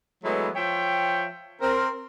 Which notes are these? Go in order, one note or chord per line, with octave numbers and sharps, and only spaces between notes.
E3 F#3 G#3 A3 B3 E4
F3 C#5 E5 G5
C4 A#4